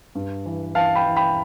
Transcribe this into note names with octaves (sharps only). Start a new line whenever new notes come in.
G2
E3
E3 F5 A5
G5 B5
E3
G5 B5